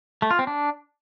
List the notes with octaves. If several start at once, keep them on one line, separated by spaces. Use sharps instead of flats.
A3
F4
C4
D4